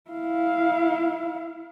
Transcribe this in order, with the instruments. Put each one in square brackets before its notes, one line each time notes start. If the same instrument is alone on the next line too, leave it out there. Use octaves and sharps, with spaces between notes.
[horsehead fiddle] E4 F5